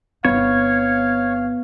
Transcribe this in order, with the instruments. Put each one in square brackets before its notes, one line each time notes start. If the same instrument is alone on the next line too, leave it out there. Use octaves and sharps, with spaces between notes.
[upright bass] G1 C4 [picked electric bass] B3 [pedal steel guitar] C#5 [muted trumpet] F5